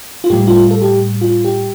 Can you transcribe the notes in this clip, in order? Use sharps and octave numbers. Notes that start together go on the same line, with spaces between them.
F4
A2 G3 G4
F4
A4
G4
F4
G4